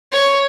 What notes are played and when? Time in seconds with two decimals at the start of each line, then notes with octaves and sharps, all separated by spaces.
0.12 C#5